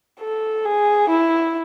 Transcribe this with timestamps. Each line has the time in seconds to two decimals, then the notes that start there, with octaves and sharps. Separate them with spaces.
0.20 A4
0.65 G#4
1.10 E4